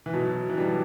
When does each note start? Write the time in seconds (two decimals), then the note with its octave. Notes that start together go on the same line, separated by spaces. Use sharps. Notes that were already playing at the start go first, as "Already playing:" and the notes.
0.06 E3
0.14 B2 F#3
0.50 E3
0.57 F#3 G3 D4